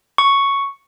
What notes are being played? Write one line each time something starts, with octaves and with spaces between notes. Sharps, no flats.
C#6